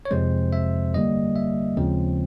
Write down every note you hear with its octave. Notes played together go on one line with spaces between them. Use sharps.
C#5
F2 C3 F3 G#3 C4 C5
E5
G2 D3 G3 A#3 D#5
E5
D#2 C#3 F3 G#3 C4